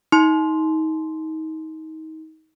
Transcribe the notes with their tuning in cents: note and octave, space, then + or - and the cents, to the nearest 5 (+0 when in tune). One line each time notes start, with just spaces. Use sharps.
D#4 +30 C6 +0